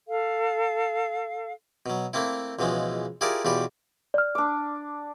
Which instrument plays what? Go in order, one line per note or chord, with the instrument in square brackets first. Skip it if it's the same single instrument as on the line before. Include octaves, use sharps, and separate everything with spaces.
[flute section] A4 F5
[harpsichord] B2 F#3
A3 A#3 C4 E4
C#2 B2 E3 F3 G#3
E4 F4 G4 G#4 A#4 D5
E2 B2 F4 G4 B5
[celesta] D5 F6
[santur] D4 D6